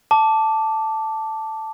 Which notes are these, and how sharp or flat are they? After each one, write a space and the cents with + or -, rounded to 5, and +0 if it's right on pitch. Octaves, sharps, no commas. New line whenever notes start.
A5 +0 D6 -5